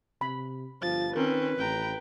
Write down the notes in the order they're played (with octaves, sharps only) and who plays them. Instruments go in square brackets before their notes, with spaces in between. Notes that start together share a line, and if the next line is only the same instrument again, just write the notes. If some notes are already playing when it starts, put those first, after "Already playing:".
[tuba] C3 [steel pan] B5
[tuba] G1 [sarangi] F3 [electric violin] A6
[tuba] D#3 [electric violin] C4 C#4 [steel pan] A#4 [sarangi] B4
[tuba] A1 [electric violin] G5 A#5